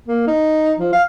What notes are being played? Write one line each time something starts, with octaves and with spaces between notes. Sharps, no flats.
A#3
D#4
F3
F5